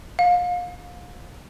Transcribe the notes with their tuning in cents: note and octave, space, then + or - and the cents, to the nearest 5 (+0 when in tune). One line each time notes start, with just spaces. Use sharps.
F5 +30